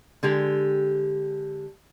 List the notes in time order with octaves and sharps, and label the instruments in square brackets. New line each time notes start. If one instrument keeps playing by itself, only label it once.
[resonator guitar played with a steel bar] D3 G#3 G4